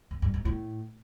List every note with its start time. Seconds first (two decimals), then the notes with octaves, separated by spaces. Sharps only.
0.11 F#2
0.22 G2
0.34 G#2
0.45 A2